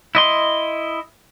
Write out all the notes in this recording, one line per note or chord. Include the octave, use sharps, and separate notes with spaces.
E4 D#5 C6